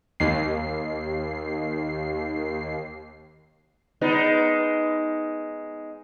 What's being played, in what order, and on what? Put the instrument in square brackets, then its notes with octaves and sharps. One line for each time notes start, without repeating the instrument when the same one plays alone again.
[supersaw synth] D#2 C7
[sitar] G#3 B3 D#4